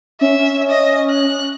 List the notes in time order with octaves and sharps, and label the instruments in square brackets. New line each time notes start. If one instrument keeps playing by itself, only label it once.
[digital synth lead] C#4 [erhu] E5
[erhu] D#5
F#6